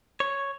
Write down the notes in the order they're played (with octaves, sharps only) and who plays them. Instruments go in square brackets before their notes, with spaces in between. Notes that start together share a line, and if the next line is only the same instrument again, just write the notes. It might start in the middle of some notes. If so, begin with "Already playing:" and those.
[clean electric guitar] C#5